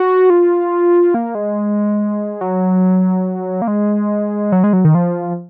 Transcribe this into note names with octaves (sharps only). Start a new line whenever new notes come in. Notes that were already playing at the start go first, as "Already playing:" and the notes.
Already playing: F#4
F4
A#3
G#3
F#3
A#3
G#3
F#3
G#3
F#3
D#3
F3